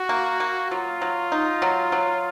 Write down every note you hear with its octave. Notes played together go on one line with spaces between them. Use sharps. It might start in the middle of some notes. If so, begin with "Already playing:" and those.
Already playing: F#4
A#3
A#3
F#3 F4
F#3
D#4
F#3
F#3